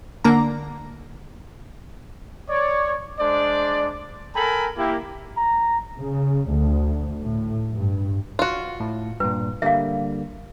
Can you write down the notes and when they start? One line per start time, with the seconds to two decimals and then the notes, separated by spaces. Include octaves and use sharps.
0.24 D3 A#3 A#5
2.50 C#5 D5
3.19 G#3 D4 C5 D5
4.35 A4 A#4 G5 G#5 A#5 B5
4.77 A#3 E4 G4
5.37 A#5
5.98 C#3
6.52 D2
7.22 A2
7.71 G2
8.39 F4 F#4
8.80 A2
9.20 G2 A#2 B4
9.62 D3 G3 A#3 E5 F5